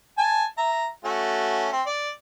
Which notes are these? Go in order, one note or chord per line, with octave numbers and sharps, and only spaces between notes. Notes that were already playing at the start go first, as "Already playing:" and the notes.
G#5 A5
E5 A#5
A3 C#4 F#4
C4
D5